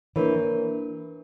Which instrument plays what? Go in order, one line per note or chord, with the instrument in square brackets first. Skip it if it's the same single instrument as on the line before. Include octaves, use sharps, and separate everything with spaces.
[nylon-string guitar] E3 [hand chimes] A#3 D4 A#4 C#5